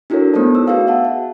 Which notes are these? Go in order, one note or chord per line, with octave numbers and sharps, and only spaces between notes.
D4 E4 F#4 A4 A#4 C#5
A3 B3 D#4 C5 D5 A5
E6
F#4 G#4 B4 F5 G5
E5 F#5 A5
E5